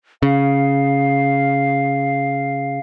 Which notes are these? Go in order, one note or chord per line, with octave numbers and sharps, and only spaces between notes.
C#3 F5